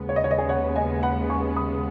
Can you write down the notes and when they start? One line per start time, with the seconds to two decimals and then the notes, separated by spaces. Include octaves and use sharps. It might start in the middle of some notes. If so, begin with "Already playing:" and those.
Already playing: D#2 C#3 G#3 B3
0.09 C#5
0.16 D#5
0.24 C#5
0.31 D#5
0.38 G#4 C#5
0.49 C#5 F#5
0.76 D#5 G#5
1.03 F#5 B5
1.30 G#5 C#6
1.56 B5 D#6